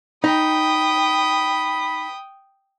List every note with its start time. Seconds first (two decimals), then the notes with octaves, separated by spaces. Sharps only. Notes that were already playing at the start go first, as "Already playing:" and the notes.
0.24 D#4 G5 B5 D#6